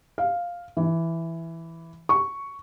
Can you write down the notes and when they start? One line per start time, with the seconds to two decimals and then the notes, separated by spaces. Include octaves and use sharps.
0.18 F5
0.77 E3
2.09 C#6